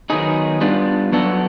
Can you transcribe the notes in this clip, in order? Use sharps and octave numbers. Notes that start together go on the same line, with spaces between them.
D#3 F#3 B3 D#4 G#4
G3 B3 D4 F4
F#3 B3 D4 F#4 A4